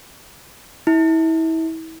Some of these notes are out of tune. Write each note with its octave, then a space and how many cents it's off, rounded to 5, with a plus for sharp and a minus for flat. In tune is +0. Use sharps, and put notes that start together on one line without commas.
E4 -30